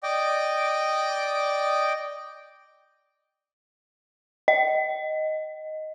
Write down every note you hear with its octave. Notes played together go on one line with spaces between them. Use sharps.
D5 D#5 G5 D6
D#5